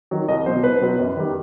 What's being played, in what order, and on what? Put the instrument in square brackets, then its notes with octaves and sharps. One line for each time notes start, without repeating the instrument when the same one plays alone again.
[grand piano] D#3 F#3
C2 D#5
B2 F#3 C5
C2 B4
B2 F#3
F#2
D#3 G3